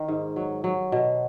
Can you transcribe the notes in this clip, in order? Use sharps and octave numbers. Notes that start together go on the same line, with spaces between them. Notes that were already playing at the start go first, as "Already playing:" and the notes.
Already playing: D#3
G#2
F#3
F#3
B2